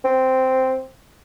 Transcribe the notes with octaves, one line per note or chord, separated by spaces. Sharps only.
C4